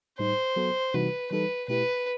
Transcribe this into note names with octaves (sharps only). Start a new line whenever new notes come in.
A2 G3 D#4 C5
F#3 B3 F#4 A4
C3 E3 G3 D#4 F#4 B4
E3 G3 D#4 A4 B4
B2 A3 E4 G4 B4